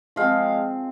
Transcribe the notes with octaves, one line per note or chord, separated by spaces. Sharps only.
F3 G#3 C4 F5